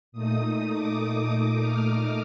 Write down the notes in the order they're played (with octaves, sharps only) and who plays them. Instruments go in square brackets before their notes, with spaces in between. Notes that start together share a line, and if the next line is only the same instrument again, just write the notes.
[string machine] A#2 A3 D#4 D#6
D6
D#6
F6
F6